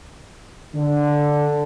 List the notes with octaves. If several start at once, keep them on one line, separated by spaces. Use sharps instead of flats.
D3